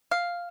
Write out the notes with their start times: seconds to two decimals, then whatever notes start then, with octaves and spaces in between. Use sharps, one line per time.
0.11 F5